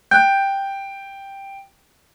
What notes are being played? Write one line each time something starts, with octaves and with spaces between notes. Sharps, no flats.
G5 F#6 G6